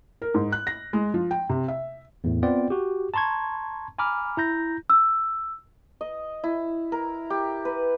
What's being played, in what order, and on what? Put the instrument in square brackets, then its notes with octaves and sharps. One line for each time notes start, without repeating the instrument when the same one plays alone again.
[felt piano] A#4
G#2
F#6
A#6
G#3
F3
G5
C3
E5
[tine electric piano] E2 A2
B3 C4 F4 D5 G5
F#4 G4
A5 A#5 C6 C#6 G#6
G#5 A#5 B5 D6 F6
E4 A#5 G6 A#6
[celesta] E6
[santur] D#5
E4
A#4
G4
B4